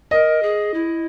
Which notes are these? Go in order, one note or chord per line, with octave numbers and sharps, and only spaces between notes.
A#4 D#5
G#4
E4